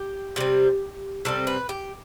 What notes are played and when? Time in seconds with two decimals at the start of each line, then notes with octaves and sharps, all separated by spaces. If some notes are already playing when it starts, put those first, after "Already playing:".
Already playing: G4
0.36 C3 G3 C4
1.25 C3 G3 C4 A4
1.47 B4
1.69 G4